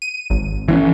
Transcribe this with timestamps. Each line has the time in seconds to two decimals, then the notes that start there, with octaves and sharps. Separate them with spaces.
0.02 D#7
0.30 G#1
0.68 E3 C4 C#4